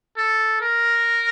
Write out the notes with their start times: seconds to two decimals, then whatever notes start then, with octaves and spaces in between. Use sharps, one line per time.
0.17 A4
0.61 A#4